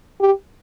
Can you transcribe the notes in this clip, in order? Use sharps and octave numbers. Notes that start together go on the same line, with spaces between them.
G4